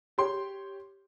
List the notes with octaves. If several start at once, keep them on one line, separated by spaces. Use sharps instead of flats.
G4 C#5 G5 C6